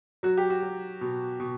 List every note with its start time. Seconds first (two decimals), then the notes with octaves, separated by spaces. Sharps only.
0.23 F#3 F#4
0.38 G4
0.50 F#4
0.62 F#3
1.01 B2
1.40 B2